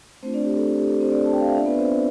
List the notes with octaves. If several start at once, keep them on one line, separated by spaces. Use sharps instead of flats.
A3 C4 D4 F4 C5
D4 D5
G4
A4
A4
G4
A4
C4 C5
D4 D5
A5
G5
F5
E5
B3 D4 F4 D5
B3 B4
C4 C5